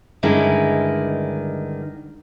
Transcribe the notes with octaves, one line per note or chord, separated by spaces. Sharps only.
G2 D3 D#3 G#3 C#4 E4